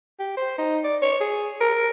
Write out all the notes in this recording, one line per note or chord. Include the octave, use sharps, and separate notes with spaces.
G4
C5
D#4
D5
C#5
G#4
A#4